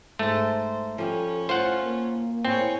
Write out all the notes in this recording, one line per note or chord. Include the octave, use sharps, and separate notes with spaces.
G#2 A3 C5 A5
F3 G3 C#4 A4
A2 F4 C5 F5 F#5 A5
A#3
A2 C4 G#4 C#5